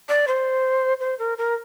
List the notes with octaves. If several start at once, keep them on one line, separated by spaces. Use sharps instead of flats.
D5
C5
C5
A#4
A#4